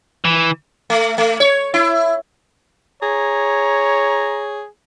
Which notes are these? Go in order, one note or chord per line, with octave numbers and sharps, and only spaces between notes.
E3
A3
A3
C#5
E4
G#4 C#5 A#5